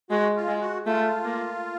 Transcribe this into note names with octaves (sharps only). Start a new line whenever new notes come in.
G#3 F#4
F4
G#3
F#4
A3 F4
A#3